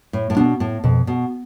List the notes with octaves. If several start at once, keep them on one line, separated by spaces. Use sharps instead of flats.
A2
A2
B2 B3 D4
A2
F2 B2
B2